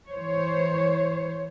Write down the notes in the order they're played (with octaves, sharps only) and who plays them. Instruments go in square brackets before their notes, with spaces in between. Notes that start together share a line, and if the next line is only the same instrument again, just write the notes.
[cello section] E3 C5 C#5